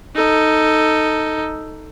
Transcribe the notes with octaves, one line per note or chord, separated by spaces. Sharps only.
D#4 A4